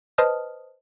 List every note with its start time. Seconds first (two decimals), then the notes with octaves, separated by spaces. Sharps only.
0.18 B4 C5 D#5 A5 D#6 F6